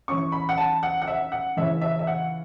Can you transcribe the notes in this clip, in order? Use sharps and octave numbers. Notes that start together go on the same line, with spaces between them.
E3 C#4 C#6
B5
F#5
A5
F#5
F#5
E5
F#5
C#3 E3 C#4 E5
E5
E5
F#5